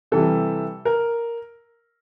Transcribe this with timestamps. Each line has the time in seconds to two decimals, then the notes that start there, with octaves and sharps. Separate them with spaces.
0.12 C3 E3 G3 A4
0.85 A#4